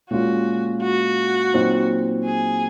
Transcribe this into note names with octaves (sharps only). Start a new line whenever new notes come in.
A#2 G#3 C#4 F4 F#4
F#4
A#2 F#3 C4 D#4
G#4